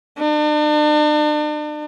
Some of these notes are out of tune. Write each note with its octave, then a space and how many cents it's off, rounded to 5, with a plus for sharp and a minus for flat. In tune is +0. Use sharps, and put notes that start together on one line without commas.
D4 +40